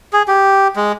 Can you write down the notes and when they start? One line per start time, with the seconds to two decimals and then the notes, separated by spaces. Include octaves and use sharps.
0.13 G#4
0.28 G4
0.76 G#3